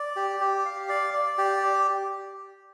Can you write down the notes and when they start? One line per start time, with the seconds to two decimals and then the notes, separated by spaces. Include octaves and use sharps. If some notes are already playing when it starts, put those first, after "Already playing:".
Already playing: D5
0.16 G4
0.40 G4
0.65 F5
0.89 D5
1.14 D5
1.38 G4